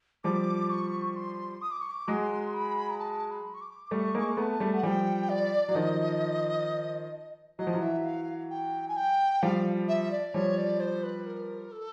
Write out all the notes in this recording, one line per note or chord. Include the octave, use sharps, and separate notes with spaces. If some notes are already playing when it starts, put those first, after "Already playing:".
F3 G3 D6
C#6
C6
D#6
D6
C#6
D6
F#3 G#3 C6
B5
A#5
A5
B5
C#6
D6
G3 A3 C#6
G#3 A#3
A3 B3 A5 A#5
G3 A3
F#5
F3 G3 G5 G#5
D5
F#3
D#3 F3 D#5
F#3 D#5
F3
E3 F#3
E5
F5
G5
G#5
G5
F3 G3 F5
E5
D5
F3 G3 C#5
D5
C5
B4
A#4
A4